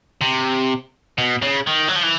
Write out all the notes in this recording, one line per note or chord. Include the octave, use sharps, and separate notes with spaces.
C3
B2
C#3
D#3
F#3
F3
E3